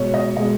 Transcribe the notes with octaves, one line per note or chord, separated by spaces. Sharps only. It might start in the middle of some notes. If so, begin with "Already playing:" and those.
Already playing: B2 G#3 C#5
D#5
B2 G#3 D#5